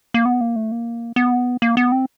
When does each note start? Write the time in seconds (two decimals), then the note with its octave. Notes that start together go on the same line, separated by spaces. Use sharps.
0.14 A#3
0.26 B3
0.41 A#3
0.56 A3
0.72 A#3
1.16 B3
1.62 A#3
1.77 B3
1.92 C4